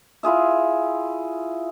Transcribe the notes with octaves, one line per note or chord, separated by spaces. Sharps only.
E4 F4 G#4 E5